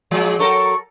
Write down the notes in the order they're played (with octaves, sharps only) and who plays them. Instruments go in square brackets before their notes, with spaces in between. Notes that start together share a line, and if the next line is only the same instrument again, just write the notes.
[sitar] A#2 F3 G#3
[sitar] F#3 A4 A#4 [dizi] C#6